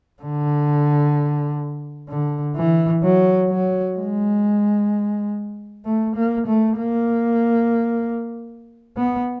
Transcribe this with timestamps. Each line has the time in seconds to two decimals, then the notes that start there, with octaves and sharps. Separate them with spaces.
0.22 D3
2.09 D3
2.56 E3
3.03 F#3
3.50 F#3
3.97 G#3
5.85 A3
6.16 A#3
6.47 A3
6.78 A#3
8.97 B3